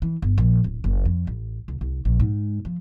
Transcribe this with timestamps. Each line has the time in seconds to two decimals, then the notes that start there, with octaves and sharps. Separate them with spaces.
0.02 E3
0.22 G1
0.38 A#1
0.64 D1
0.84 F#1
1.05 F2
1.27 A1
1.68 C#2
1.81 C2
2.05 A#1
2.20 G#2
2.65 F3